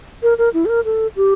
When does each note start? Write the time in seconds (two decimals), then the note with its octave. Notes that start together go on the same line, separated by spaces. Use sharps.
0.23 A#4
0.38 A#4
0.54 E4
0.65 A4
0.69 A#4
0.85 A4
1.16 G4